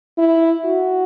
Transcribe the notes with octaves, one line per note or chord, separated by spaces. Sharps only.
E4
F#4